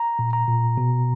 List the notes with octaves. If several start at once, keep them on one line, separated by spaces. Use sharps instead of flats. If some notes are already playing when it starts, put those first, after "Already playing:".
Already playing: A#5
A#2
A#5
A#2
B2